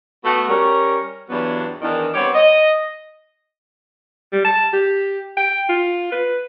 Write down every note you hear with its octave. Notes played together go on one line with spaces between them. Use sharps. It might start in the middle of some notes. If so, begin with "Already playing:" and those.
A3 B3 F#4
G3 C#4 A#4
E2 G2 E3 F#3 B3 D4
E2 D#3 D4
G3 B3 C4 G4 C#5
D#5
G3
A5
G4
G5
F4
B4